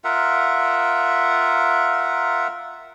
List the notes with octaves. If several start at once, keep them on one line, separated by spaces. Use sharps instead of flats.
F4 A#4 E5 F#5